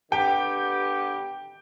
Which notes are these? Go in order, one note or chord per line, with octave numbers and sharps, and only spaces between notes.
D3 B3 G4 G5